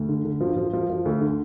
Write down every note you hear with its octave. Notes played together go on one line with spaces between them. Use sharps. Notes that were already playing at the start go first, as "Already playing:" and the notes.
Already playing: D2
D3
D3
F3
F3
F3
F3
D2
D3